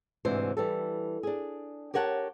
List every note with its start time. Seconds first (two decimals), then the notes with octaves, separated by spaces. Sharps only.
0.25 D2 G#2 C3 E3 D4 C5
0.57 E3 G3 A4
1.23 D4 G#4
1.94 G4 A#4 C#5 F#5 G5 A5